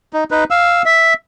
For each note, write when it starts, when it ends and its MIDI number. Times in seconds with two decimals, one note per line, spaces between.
0.13 0.24 63
0.31 0.44 63
0.31 0.44 71
0.51 0.82 77
0.51 0.82 88
0.85 1.14 76